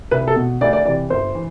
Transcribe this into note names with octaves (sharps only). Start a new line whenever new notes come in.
C2 B4
A4
B2
D2 D5
D5
C3 E3 D5
G1 C5
E3